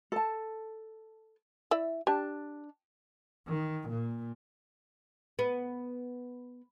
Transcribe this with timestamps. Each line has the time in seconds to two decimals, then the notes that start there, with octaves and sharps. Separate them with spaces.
0.12 A4 A5
1.71 E4 D5 E5
2.07 D4 G4 A5
3.48 D#3
3.90 A#2
5.39 B3